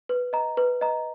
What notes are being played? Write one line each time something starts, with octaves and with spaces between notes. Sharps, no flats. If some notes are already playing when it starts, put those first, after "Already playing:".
B4
D#5 A#5
B4
D#5 A#5